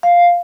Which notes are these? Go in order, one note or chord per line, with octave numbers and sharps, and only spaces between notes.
F5